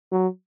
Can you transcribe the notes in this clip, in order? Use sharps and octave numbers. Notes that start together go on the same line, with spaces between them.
F#3